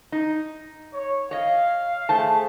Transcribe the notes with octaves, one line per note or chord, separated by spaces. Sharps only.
D#4
C#5
C#5 D#5 F5
A3 G#4 C5 A5